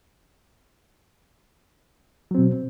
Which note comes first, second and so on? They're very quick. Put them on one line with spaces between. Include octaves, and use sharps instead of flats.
F#3 C4 B2